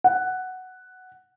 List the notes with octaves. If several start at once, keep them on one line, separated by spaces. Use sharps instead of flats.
F#5